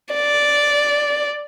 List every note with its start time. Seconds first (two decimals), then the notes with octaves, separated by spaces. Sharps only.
0.14 D5